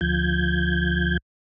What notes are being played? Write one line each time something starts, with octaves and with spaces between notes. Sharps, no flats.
D2 F3 G6 G#6